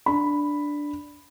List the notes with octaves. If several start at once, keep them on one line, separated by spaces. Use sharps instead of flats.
D4 B5